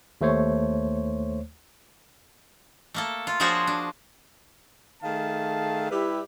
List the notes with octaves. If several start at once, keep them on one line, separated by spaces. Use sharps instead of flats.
D#2 A3 C5 C#5
A3 A#3 A4
F4
F3 D4 F#4 G#4 C5 C#5
D4
D#3 A3 G#4 F5 A5
G3 E4 G4 B4 E5